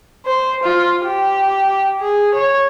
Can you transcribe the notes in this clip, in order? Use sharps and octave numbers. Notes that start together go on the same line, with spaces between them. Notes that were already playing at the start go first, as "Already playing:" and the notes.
C5
F4
G4
G#4
C#5